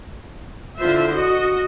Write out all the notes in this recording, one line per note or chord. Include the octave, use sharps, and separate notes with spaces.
D3 E4 F4 C5 E5
F#4 D#5